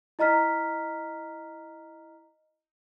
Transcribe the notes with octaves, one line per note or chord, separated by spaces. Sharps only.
E4 D#5 A#5 F6 B6